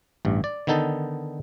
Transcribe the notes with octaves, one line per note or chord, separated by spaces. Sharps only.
A1 G2
D5
D3 D#3 B3 D#4 A4